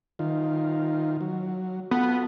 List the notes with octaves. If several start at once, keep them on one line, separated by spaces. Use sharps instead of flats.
D#3 F4
F#3
B3 F4 F#4 A4